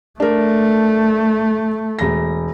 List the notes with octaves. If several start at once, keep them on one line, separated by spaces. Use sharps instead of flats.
A3 D4 A#4
E1 A#6